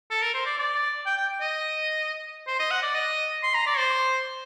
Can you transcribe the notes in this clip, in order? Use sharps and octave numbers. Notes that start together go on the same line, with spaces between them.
A4
A#4
C5
D5
D5
G5
G5
D#5
C5
D#5
F#5
D5
D#5
C6
A#5
D5
C5